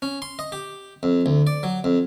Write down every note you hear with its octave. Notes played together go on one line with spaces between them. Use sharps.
C#4
C6
D#5
G4
F2
D2
D5
F#3
F2